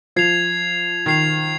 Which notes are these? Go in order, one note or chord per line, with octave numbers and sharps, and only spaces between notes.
F3 G#6 C7 F7
D#3 G#6 C7 F7